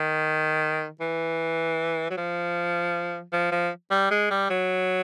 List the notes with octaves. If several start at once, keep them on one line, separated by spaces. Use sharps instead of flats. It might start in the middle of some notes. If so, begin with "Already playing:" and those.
Already playing: D#3
E3
F#3
F3
F3
F3
G3
G#3
G3
F#3